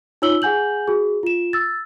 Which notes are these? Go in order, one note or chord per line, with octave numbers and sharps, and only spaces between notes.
D#4 F4 C#5 E6 F#7 G7
G#4 F#5 G#5 G6 F#7
F#4 G#4
F4 E7
E6 A6